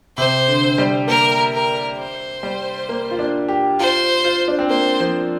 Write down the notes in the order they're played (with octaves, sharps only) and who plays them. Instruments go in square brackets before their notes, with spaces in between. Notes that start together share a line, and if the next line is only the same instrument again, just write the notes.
[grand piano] C3 [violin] C5
[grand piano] D3
G3
[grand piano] A#3 [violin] A#4
[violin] A#4
C5
[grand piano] G3
A#3
F4
D4
G4
[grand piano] F4 [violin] C5
[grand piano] F4
D4
C4
[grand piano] A#3 [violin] C5
[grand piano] F3